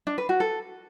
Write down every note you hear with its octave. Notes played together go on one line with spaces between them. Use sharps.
D4
B4
F#4
A4